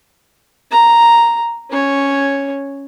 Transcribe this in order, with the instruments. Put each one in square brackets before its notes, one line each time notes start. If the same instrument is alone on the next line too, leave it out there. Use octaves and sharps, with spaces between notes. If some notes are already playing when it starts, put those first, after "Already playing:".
[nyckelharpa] A#5
C#4 C#5